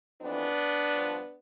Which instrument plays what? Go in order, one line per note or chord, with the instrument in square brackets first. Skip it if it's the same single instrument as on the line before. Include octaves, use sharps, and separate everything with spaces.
[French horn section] F2 E3 B3 D4
G2 F3